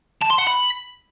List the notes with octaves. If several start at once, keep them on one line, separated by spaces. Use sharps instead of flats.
A5
C6
F#5
B5